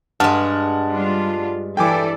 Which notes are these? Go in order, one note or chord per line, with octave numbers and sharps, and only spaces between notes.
G2 G#3 F#5 A5 F6
G3 D4 F4
E3 A4 D5 G5 G#5 D6